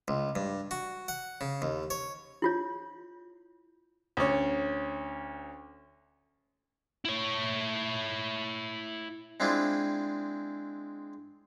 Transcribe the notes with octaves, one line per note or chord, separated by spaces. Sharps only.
C#2
G2
F#4
F#5
C#3
D#2
C#5
E4 F4 C#5
D2 C#4
E4 C#5
G#3 C4 D4 E4 F4